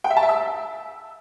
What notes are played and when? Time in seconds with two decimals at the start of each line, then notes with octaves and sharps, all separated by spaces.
0.04 G5
0.10 E5
0.17 A5
0.23 E5
0.29 E6